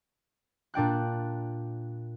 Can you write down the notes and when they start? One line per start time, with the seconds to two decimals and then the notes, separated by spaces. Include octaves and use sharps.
0.74 A#2 D4 G5 F#6